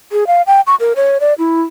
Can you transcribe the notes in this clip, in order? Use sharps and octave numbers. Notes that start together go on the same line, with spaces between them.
G#4
F5
G5
C#6
A#4
C#5
D5
E4